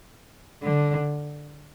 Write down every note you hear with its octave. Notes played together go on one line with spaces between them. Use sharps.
D3